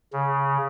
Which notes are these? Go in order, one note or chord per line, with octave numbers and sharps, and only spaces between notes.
C#3